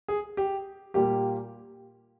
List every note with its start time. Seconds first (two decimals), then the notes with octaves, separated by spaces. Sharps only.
0.08 G#4
0.37 G4
0.94 A#2 G3 A#3 G4